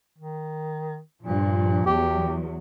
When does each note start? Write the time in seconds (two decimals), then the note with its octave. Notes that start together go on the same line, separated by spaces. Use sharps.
0.18 D#3
1.23 G2 A#2 F3
1.86 E2 F#3 G4